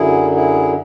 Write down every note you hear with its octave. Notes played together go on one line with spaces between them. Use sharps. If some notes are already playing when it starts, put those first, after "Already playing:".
Already playing: F#2 D3 F#3 E4 G#4
E4 G#4